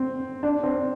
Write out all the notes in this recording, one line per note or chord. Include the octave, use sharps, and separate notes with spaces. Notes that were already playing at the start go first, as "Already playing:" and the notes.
Already playing: C4
D4
C4